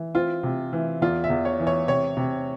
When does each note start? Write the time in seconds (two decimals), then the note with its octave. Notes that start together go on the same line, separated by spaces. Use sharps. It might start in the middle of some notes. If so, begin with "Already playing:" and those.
Already playing: E3
0.15 C4 F4
0.43 C3
0.73 E3
1.01 E2 F4
1.24 E5
1.30 E2
1.45 C#5
1.60 E3
1.67 C#5
1.88 C3 C#5
2.17 C3